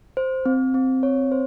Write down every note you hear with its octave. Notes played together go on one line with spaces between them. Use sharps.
C5
C4
C4
C#5
C5